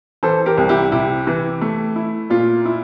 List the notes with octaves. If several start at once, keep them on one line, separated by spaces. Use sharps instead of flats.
E3 A4 C5
G4 A#4
C2
E4 G4
C3 E4 G4
E3
A3
E4
A#2 F4
E4